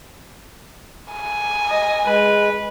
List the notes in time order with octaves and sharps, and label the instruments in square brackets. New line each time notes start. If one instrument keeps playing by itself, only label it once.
[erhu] G#5
[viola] D#5
[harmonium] G#3 [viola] B4